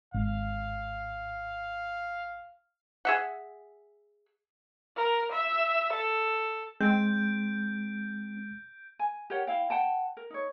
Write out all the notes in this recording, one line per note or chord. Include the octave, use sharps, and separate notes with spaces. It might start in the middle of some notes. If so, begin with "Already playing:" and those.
G#1 F5
G#4 E5 F#5
A#4
E5
A4
G#3 C4 G6 D7
G#5
G4 A#4 C#5 F#5
E4 F5 G5
F#5 G5 A5
A#4
D#4 C#5